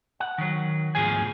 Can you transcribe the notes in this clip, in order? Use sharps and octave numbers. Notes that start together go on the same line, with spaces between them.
F#5
D#3 F#3
D2 G#2 B2 F3 G#4 G#5